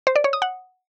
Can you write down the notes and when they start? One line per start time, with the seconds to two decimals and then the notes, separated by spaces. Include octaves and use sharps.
0.07 C5
0.16 D5
0.24 C#5
0.33 D#6
0.42 F#5